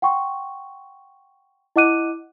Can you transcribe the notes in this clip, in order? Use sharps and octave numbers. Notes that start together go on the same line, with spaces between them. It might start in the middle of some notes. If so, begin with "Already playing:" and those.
F#5 G5 C6 C#6
E4 D#5 F#5 D6 F#6 D#7